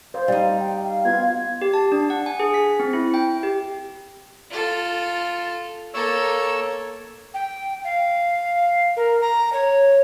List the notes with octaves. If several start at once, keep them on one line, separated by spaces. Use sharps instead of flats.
C5 F5
G3 D#4
G5
F5
B3 F4 G#6
G4
A5
D4
F#5
G#5
G#4
B6
C4
E4
G5
G4
F4 A4
A#3 A4 C#5 E6
G5
F5
A#4
A#5
C#5